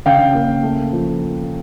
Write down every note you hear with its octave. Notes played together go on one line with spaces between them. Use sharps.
C#3 F5 G5
A#3
A3
F3